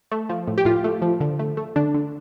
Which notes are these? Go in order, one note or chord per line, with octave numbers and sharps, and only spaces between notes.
A3
F3
A2
G4
A2 F4
A3
F3
D3
A3
A3
D3 D4
D3